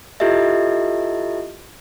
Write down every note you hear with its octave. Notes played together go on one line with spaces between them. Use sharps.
E4 F4 G4 A4 D#5 E5